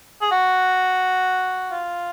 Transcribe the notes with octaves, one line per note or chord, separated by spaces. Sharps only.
G#4
F#4
F4